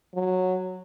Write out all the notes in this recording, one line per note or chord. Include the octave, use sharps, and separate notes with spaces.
F#3